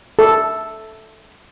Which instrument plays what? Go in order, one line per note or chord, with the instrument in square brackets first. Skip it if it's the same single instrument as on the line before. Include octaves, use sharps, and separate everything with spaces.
[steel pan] A4